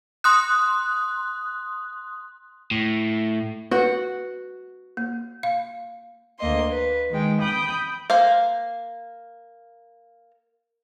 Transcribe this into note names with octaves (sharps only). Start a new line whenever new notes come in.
C6 D#6 F#6
A2
F#4 B4 F#5
A#3
F5
D2 A#3 D#5 C6
B4
D#3 G#3 G5
G5 B5 D#6 G6
A#3 C5 F5